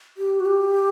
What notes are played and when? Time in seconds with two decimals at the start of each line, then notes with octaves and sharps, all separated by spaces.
0.17 G4
0.40 F#4
0.45 G4